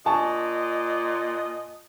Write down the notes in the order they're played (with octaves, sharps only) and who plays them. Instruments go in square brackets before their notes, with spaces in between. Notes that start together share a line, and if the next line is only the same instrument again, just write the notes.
[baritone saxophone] A#2 [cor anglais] D#5 [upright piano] G#5 A5 C#6